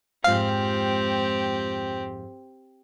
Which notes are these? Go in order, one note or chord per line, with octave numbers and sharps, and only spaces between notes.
F2 G#2 C4 F4 G4 F5